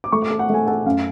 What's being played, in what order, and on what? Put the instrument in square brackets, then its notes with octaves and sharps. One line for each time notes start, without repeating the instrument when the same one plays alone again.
[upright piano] D6
[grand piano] A3 [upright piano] C#6
[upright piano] D6
[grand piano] A4
[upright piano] F#5
[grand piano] A3 [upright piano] G#5
[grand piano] A4 [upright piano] F#5
[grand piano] F#2 [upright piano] F5